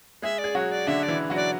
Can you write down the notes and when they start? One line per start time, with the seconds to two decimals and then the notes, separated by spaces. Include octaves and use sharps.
0.22 G#3 G#4 E5
0.38 D5
0.44 G#4
0.55 F#3 F#4 C#5
0.71 D5
0.87 D3 D4 E5
1.03 D5
1.08 E3 E4
1.30 F#3 F#4
1.36 D5